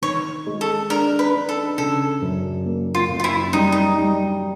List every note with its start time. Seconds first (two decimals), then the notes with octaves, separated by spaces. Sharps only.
0.02 D#3 C#5
0.47 G#3
0.61 A4
0.90 D4 A#4
1.19 B4
1.34 D4
1.49 A4
1.78 C#3 A4
2.22 F#2
2.66 A#3
2.95 F4
3.09 F#2
3.20 F4
3.24 E4
3.53 G3 D#4
3.72 D#4
3.97 G3